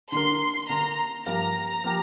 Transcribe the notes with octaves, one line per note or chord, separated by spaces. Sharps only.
D3 A#3 D4 A#4 C6
D3 A#3 D4 A#4 A#5
G2 F3 A#3 G4 A#4 A#5
F3 A#3 G4 A#4